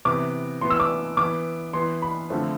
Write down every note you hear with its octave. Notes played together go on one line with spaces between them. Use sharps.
C3 E3 B3 D6
A2 E3 B3 C6
E6
D6
E3 B3 D6
E3 B3 C6
B5
D3 F3 A3 C4